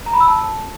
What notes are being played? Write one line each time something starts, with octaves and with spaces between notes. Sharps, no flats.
A#5
B5
E6
A5